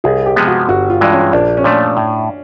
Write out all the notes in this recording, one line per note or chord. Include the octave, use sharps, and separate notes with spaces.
C2 G#4
G4
C3 F3 G#3 B3
F#4
G1 F#4
F4
G2 E3 G#3 D4
C#4
A#1 D4
C#4
A#2 F3 A3 D4
A2